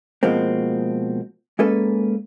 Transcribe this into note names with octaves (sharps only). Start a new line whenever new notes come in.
B2 F3 G#3 A#3 C4
G#3 A#3 C#4 A4 B4